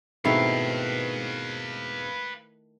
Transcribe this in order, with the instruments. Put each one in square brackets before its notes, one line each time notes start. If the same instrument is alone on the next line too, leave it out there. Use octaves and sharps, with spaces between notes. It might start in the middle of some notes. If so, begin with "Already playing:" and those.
[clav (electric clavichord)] G#2 B2 C4 [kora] D#3 A3 E4 [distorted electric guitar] B4 F5